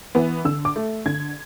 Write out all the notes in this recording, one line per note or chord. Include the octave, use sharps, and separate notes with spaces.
E3 B3
D3 E6
D6
A3
D3 G#6